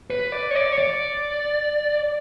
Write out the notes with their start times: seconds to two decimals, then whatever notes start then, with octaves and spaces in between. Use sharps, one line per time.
0.10 B4
0.32 D5
0.51 C#5
0.55 D5
0.72 C#5
0.78 D5